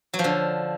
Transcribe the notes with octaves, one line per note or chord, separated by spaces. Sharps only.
F#3
F3
D3